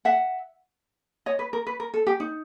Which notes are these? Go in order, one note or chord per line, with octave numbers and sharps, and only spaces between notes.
E5 F#5
C#5 D#5
B4
A#4
B4
A#4
A4
G4
D#4